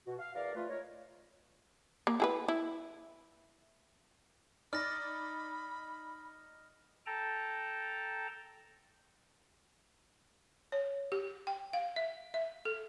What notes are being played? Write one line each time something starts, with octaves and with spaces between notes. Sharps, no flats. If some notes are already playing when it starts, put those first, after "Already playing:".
B2 F#4
F5
E2 A#4 D5 F5
F3 A3 F4 B4
D#4 A#4 C#5
A#3
E4 G#4 B4
E4
D#4 D5 B5 F6 A#6
A4 G5 A5 A#5
C#5
G4
G5
F5
E5
E5
A4